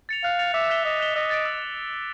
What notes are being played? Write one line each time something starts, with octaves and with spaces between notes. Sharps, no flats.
A6 C#7 F7
F5 F#6
A6 C#7 F7
E5 D6
F#6 B6 E7 G7
D#5 D6
F#6 B6 E7 G7
D#5 E6
A6 D7
E6